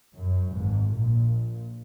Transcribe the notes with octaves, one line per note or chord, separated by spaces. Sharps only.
F#2
G#1 G#2
A#1 A#2